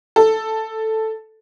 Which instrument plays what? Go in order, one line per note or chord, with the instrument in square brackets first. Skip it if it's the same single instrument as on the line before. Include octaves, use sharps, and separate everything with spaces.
[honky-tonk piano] A4